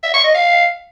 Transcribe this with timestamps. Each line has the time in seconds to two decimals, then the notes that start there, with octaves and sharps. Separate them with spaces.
0.03 E5
0.14 C#6
0.24 D#5
0.35 F5